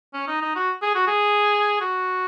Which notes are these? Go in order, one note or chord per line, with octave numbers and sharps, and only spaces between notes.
C#4
D#4
D#4
F#4
G#4
F#4
G#4
F#4